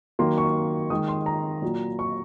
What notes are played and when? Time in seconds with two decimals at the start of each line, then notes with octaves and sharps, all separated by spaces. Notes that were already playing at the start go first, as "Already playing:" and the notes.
0.19 D#3 F#3 A#3 C6
0.38 C#6
0.90 D#3 G#3 D#6
1.08 C6
1.26 A#5
1.62 A#2 F#3 A#3
1.99 C#6